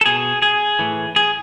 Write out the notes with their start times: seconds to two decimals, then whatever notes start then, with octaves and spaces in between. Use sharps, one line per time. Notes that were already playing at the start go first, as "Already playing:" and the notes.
0.01 A4
0.06 B2 G#4
0.42 G#4
0.79 A2 E3
1.16 G#4